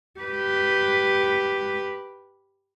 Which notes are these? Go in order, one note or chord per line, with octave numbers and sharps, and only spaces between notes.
G4 B4